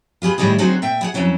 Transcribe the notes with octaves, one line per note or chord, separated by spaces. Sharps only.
F4 G4 G#4 B4
A2 D#3 G3 D#4 E4 G#4
D3 F#3 C4 D#4 F#4 G#4
A#2 E5 G5
E4 G#4 F#5
F2 B2 F#3 C#4 E4